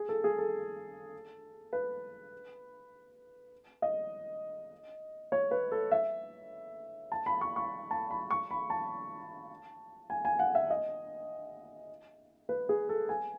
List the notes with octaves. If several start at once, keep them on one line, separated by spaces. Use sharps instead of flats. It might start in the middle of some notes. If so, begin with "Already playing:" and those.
Already playing: G#4
A4
G#4
A4
B4
D#5
C#5
B4
A4
E5
A5
B5
C#6
C#6
A5
B5
C#6
B5
A5
G#5
G#5
F#5
E5
D#5
B4
G#4
A4
G#5